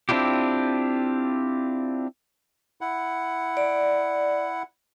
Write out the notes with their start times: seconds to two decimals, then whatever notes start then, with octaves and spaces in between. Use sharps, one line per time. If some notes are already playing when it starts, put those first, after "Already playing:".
0.09 C4 D4 E4 F4 G4
2.81 E4 F#5
3.57 D5